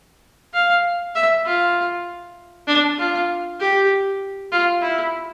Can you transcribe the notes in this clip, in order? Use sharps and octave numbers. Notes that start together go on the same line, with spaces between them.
F5
E5
F4
D4
F4
G4
F4
E4